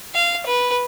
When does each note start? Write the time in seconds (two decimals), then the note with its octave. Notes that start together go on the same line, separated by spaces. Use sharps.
0.15 F5
0.46 B4